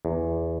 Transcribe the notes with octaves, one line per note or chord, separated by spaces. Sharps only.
E2